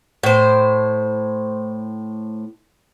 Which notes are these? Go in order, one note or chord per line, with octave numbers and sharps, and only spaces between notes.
A2 C5